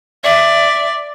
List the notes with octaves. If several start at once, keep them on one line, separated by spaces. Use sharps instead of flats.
D5 E5